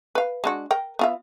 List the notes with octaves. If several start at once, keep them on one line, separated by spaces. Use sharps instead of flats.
B4 F5
G#3 D4 F#4
A#4 G5
B3 F4 E5